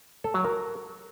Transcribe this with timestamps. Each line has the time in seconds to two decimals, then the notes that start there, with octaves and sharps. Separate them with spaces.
0.24 A4
0.34 F#3
0.44 A#4